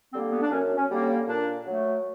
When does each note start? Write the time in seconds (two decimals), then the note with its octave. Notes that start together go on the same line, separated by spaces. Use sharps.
0.13 D3 G3 A#3 C4
0.32 B3
0.42 D4
0.51 F#2 C#4
0.77 C#4
0.90 D3 G3 A#3
1.02 C#4
1.27 A#2 D4
1.66 F#3 A3